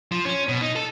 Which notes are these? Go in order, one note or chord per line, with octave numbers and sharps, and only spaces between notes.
F3
C#4
B2
D#4
A4